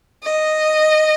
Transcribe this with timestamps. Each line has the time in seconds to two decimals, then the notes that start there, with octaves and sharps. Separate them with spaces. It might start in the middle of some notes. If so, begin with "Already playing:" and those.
0.23 D#5